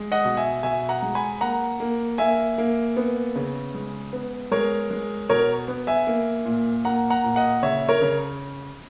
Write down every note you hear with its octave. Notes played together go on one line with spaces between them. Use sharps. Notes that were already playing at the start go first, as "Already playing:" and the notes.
Already playing: G#3
D#5 F#5
B2
E5 G#5
B2 E5 G#5
F#5 A#5
G#3
G#5 B5
A#3 F#5 A#5
A#3
A#3 E5 G#5
A#3
B3
C#3
G#3
B3
G#3 A#4 C#5
G#3
B2 A#4 C#5
B3
E5 G#5
A#3
A#2
A#3 F#5 A#5
F#5 A#5
A#2
D#5 F#5
C#3 C#5 E5
A#4 C#5
C#3